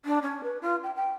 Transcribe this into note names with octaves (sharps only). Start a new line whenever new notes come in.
D4
C#4
B4
F4
G5
G5